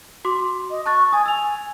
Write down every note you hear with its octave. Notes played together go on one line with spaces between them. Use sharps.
F#4 C6 D6
D#5
A5 C#6 F#6 A6
G#5 D#6 A6
G#5 E6 F7